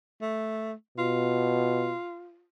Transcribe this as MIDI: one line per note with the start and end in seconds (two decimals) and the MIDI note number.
0.21 0.72 57
0.98 1.94 47
0.98 2.44 65